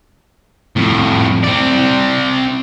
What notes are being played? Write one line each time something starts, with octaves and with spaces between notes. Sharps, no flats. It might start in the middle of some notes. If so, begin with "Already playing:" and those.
F2 A2
C4 D5